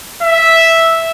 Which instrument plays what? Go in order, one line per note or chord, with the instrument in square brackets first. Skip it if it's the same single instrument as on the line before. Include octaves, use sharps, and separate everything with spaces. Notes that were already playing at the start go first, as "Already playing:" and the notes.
[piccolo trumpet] E5